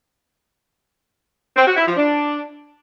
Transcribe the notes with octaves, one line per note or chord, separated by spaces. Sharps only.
C4
F#4
E4
F3
D4